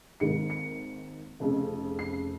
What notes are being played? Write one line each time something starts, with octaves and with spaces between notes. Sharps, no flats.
G#1 G#2 D#3 A#3 C#7
C#7
F1 F2 C#3
C7